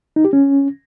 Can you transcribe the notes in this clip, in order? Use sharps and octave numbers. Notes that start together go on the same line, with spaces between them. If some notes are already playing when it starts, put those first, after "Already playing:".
D#4
G4
C#4